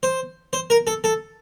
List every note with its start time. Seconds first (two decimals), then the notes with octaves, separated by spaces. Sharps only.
0.03 C5
0.53 C5
0.70 A#4
0.87 A4
1.04 A4